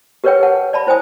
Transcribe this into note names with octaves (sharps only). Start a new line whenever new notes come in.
G4 A#4 B4 C#5 F#5 G5
F#5 A5
D5 A5 B5
E4 C5 G5 G#5 D#6